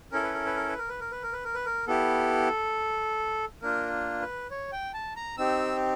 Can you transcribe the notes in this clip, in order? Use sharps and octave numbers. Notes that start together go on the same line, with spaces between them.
C#4 E4 A4 A#4
B4
A#4
B4
A#4
B4
A#4
B4
A#4
B4
A#4
B4
A#4
B4
A#4
B3 E4 G4 A4
A#3 D4 F4 A#4
B4
C#5
G5
A5
A#5
C4 D#4 G4 E6